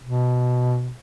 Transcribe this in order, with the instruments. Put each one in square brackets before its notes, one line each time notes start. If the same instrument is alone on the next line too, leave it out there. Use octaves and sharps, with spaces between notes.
[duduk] B2